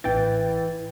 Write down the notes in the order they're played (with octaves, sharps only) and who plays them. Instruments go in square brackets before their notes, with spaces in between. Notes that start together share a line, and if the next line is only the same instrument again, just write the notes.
[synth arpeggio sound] A1 G5 A6 [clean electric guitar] E3